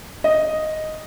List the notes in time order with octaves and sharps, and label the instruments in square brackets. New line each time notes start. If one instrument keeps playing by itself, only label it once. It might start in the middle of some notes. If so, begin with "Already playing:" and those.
[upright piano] D#5